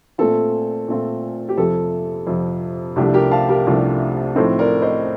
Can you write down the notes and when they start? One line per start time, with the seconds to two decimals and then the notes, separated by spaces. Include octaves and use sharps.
0.18 A#2 A3 C4 F4 A4
0.88 A#2 A3 C4 F4
1.49 G4
1.58 F2 C3 F3 A4
2.27 F2 C3 F3
2.96 C2 C3 F3 A3 D4 G4
3.14 G4 A#4
3.31 F5 A5
3.49 G4 A#4
3.66 C2 C3 F3 A3 D4
4.36 A2 F3 C4 D#4 A4 C5
4.59 A#4 D5
4.82 C5 D#5